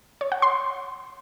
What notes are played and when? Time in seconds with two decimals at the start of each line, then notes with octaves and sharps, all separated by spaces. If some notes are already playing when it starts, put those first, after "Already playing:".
0.21 C#5
0.32 F#5
0.42 C6